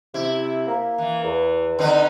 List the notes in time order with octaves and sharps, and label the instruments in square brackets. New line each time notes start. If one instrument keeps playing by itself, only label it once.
[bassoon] C3 [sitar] E4
[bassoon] A#3
[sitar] E3
[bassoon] E2
[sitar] D3 D#4 B4 [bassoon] C4